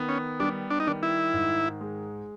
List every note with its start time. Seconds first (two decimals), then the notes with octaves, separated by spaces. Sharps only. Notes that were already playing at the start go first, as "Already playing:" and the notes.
Already playing: D#3 B3
0.09 C#4
0.40 G3 D4
0.70 D4
0.80 D#4
0.87 D#3 D4
1.03 E4
1.34 G#2
1.81 G#3